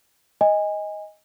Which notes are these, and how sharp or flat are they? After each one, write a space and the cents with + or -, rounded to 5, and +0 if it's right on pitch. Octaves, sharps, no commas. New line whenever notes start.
D#5 +10 G#5 -20